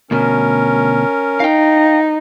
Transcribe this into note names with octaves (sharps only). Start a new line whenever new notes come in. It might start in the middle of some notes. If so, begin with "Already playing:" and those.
D2 B2 C#4 A#4
D#4 F5 G5